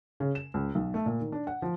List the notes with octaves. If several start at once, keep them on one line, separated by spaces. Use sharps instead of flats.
C#3
E7
C#2
B1
A3
A#2
D#3
D4
F#5
F3